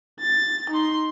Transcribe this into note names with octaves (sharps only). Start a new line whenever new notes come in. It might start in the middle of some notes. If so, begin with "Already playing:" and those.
A6
D#4 C6